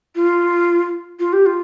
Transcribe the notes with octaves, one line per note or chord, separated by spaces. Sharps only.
F4
F4
G4
F4